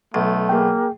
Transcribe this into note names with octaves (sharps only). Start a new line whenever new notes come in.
B1 A3
A#3 G#4 G5